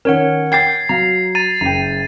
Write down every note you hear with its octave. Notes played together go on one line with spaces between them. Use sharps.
D#3 C#4 A#4 C#5 F#5
G5 G#6 A6 C7
F#3 F5 A#5
A#5 A6 D#7
F#1 G5 A#5